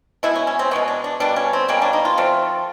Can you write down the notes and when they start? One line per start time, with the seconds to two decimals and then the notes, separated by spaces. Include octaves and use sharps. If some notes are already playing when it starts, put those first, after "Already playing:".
0.23 B2 G#3 B3 E4
0.36 C#4
0.47 C#4
0.59 C4
0.71 B2 G#3 B3 C#4
0.88 D4
1.04 D4
1.20 B2 G3 A#3 D4
1.36 C#4
1.53 C4
1.68 B2 G3 A#3 C#4
1.82 D4
1.93 D#4
2.05 F4
2.18 F3 A3 C4